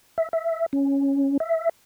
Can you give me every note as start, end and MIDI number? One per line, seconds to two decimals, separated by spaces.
0.18 0.29 76
0.33 0.66 76
0.73 1.38 61
1.40 1.69 76